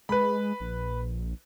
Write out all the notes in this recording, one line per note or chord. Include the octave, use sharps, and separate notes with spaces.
G#3 B4 B5
A#1